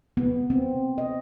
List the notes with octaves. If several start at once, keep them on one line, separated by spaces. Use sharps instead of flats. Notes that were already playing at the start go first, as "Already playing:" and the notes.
B3
C4
D#5